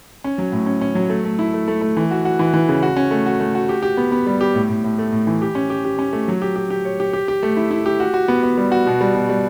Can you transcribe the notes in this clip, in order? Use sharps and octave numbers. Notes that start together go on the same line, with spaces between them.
C#4
F#3
A2
C#4
C#4
F#3
A3
A3
E4
A3
A3
A3
E3
F#4
F#4
E3
E3
C#3
F#4
C#4
A3
F#4
A3
F#4
G4
G4
B3
B3
G3
G4
A2
A2
A2
A3
A2
E3
G4
C#4
G4
G4
C#4
A3
F#3
G4
G4
G4
C#5
G4
G4
G4
A3
E4
E4
G4
F#4
F#4
B3
B3
G3
F#4
B2
G3
B2
G3